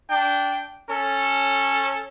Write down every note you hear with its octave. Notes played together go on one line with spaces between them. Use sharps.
D4 G5
C#4 A4